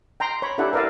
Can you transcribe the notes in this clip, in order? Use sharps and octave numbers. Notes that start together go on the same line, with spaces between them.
G5 A#5 C6
C#5 B5
D4 E4 G4 A4 F#5
A#4 B4 D5 E5 F5